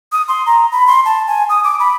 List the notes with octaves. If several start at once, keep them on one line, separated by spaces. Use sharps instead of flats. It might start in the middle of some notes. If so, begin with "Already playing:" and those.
D#6
C6
A#5
B5
C6
A5
G#5
D#6
D6
B5